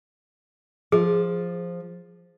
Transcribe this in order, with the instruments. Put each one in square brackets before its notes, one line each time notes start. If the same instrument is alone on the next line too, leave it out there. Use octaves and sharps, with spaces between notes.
[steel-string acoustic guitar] F3 [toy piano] G#4